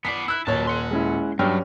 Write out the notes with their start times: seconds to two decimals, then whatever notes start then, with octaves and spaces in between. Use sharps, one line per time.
0.05 B3 D5 B6 C7
0.28 E4 E6 F#6
0.47 D#1 F#2 C#5 A5
0.67 F#5 C6
0.91 G#3 C#4 E4
1.39 G2 F#3 C#4 G4 G5 F6